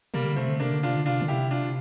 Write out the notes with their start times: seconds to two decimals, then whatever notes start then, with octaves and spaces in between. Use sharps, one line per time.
0.14 C3 G3 A#3
0.25 D3
0.36 C3 A3 C4
0.49 D3
0.60 C3 A#3 D4
0.73 D3
0.83 C3 D4 F4
0.97 D3
1.06 C3 D4 F4
1.21 D3
1.28 C3 E4 G4
1.51 D4 F4